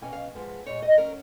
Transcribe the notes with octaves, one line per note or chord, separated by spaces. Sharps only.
B2 A#3 C#4 G#5
F5
G#2 F3 G#3 B3
A#2 G#3 D#4 C#5
D#5
F#3 C#4 A#4